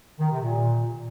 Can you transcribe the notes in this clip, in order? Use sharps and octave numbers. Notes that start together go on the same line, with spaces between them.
D#3
C3
A#2